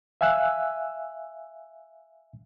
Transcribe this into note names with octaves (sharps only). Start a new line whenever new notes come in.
E5 F5 G#5 E6 F#6